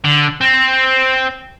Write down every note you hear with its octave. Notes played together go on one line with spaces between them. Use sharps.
D3
C4